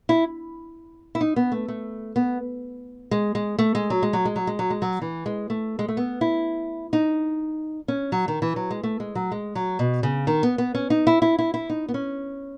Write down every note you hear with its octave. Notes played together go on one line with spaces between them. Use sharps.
E4
E4
D#4
B3
A3
A3
B3
G#3
G#3
A3
G#3
F#3
G#3
F#3
G#3
F#3
G#3
F#3
G#3
F#3
E3
G#3
A3
G#3
A3
B3
E4
D#4
C#4
F#3
D#3
E3
F#3
G#3
A3
G#3
F#3
G#3
F#3
B2
C#3
D#3
B3
B3
C#4
D#4
E4
E4
E4
E4
D#4
B3
C#4